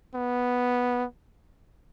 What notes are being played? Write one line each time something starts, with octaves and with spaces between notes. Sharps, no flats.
B3